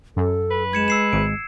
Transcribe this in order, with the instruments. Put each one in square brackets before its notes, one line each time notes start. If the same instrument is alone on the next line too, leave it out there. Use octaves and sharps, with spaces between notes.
[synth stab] F#2 [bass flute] A4
[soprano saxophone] B4
[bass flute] G#3 [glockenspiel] G#6 C#7 E7
[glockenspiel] E6 C7 E7
[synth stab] G#1 [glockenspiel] D7